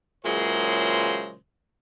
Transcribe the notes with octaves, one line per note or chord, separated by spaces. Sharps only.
A#2 C#3 E3 F#3 G#3 C5